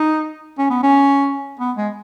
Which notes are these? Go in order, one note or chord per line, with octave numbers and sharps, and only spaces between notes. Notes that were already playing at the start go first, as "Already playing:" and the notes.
Already playing: D#4
C#4
B3
C#4
B3
G#3